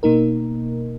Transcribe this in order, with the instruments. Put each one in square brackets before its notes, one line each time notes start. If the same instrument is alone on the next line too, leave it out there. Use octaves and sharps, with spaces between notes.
[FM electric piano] B2 A#3 D#4 A#4